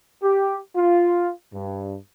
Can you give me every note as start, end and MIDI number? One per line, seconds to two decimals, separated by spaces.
0.23 0.57 67
0.76 1.30 65
1.54 1.95 43